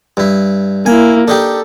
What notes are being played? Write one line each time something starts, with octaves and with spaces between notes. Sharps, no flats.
G2 E4
A#3 E4 G#5
D4 D#4 G4 A4